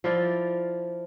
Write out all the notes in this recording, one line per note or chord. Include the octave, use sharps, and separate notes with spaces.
F3 E4 F4 D5